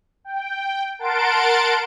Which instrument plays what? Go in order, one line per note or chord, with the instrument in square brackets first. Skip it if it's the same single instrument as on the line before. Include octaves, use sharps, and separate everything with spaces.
[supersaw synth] G5
A#4 F#5 A5 C6 A6 D7